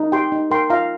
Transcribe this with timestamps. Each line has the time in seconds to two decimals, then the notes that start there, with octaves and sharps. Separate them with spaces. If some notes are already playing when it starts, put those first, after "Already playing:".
Already playing: D#4
0.12 G4 G5 C6
0.32 D#4
0.51 A#4 G5 C6
0.70 F4 F5 A#5